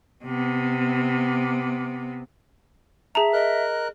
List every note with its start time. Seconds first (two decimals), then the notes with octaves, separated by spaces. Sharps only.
0.25 C3 B3
3.15 G#4 E5 A5 A#5
3.33 A#4 D#5 F#6